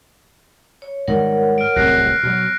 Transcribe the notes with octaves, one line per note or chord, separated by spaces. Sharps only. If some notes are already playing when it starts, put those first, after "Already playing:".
C#5
G#2 D#3 G3 A#4 C#5 F#5
F6 D7
D1 C2 F#2 F#6 A#6 C7
B2 F#3